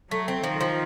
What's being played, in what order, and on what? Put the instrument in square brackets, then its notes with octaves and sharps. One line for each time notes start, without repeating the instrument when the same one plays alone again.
[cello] F#3 [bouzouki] A3
[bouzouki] C4
[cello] D#3 [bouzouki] F3
[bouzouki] F3